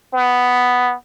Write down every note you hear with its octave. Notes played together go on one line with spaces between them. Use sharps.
B3